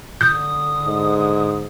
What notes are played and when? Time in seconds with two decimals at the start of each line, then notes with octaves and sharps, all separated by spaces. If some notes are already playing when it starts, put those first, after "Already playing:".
0.21 D3 D#6 G6
0.85 G#2